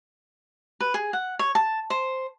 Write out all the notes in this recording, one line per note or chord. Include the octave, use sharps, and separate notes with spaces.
B4
G#4
F#5
C#5
A5
C5